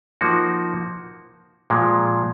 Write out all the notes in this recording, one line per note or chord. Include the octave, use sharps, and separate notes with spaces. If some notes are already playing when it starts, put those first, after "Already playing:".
F3 A#3 D#4 F#4
A#2 F3 G#3